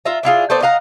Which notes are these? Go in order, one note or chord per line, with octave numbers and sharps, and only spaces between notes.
F4 E5 A#5
D4 E4 F4 G#4
A3 B3 C5 D5
D#5 F5 F#5 A#5